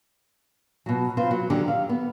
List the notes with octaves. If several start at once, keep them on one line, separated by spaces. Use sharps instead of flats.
B2 F#3
B3 C4 F4 B4 C5
F#3
D3 D#3 F#3 G4
F5
B3